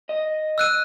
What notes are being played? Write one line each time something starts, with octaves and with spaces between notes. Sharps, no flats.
D#5
E6 F#6 D#7